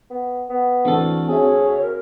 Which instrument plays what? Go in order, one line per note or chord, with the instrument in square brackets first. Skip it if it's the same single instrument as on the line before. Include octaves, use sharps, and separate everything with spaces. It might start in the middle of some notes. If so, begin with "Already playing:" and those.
[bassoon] B3
B3
[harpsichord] D2 A4 [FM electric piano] E3 C4 [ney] F#4
[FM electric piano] C4 F#4 E5 [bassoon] G#4 [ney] C#5
[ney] A#4